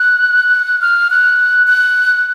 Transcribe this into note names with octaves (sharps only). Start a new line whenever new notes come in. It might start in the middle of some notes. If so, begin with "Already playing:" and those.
Already playing: F#6
F6
F#6
F#6